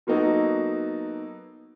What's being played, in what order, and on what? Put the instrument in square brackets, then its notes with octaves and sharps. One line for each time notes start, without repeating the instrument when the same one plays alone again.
[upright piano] F#3 A#3 B3 D#4 F#4 A4